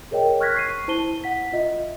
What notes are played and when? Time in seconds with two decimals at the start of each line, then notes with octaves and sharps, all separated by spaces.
0.11 G#4 A#4 C#5 D#5 G5
0.40 C#6 F6 F#6 G#6 A#6 B6
0.54 C#6 C7 D#7
0.88 E4 C5 A5 D#7 G7
1.24 F#5 B6
1.53 F4 D#5 E5